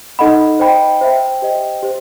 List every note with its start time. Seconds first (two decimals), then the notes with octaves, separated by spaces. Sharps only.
0.19 D#4 A4 D#5 F#5 B5
0.59 C5 D#5 G5 B5
1.01 C5 E5 G5
1.42 G4 C5 D#5 G5
1.83 G4 C5